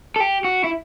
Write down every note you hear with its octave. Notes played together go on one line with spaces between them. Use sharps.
A4
G4
F#4
E4